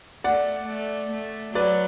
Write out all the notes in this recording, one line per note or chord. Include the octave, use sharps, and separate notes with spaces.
A3 D5 F#5
A3
A3
F#3 B4 D5